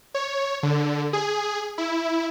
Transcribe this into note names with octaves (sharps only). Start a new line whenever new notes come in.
C#5
D3
G#4
E4